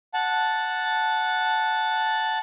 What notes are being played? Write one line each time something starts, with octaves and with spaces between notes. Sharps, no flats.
F#5 A5